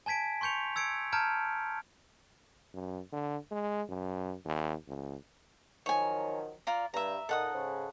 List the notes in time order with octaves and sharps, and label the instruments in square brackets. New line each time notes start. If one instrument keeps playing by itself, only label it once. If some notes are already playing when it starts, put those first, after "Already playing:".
[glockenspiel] G#5 A5 G#6 B6 D7
C6 C#6 G6 C#7 F7
E6 G#6 C#7 D7
A5 A#5 F6 G6 G#6 D7
[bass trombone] F#2
D3
G#3
F#2
D#2
C#2
[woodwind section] D#3 F3 F#3 [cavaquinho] C#5 G#5
[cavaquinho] F4 D5 A#5
[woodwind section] G2 [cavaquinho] E5 A#5
[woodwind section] A#2 D#4 [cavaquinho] A4 F#5 D#6
[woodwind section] G#2 C#3